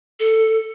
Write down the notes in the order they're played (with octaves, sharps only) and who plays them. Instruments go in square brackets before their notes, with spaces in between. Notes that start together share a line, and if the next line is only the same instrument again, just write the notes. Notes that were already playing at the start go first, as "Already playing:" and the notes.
[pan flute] A4